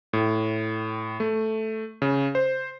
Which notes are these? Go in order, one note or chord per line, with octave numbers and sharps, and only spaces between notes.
A2
A3
C#3
C5